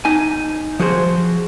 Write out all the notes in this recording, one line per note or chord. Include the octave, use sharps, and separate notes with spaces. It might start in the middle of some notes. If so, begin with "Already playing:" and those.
D#4 G#5
F3 F#4 G#4 C5